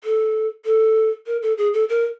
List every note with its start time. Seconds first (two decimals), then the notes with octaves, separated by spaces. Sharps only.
0.04 A4
0.66 A4
1.27 A#4
1.42 A4
1.58 G#4
1.74 A4
1.89 A#4